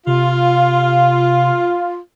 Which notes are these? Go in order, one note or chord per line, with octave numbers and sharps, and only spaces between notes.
C3 F4